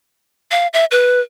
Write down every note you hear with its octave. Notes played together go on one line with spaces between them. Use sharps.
F5
E5
B4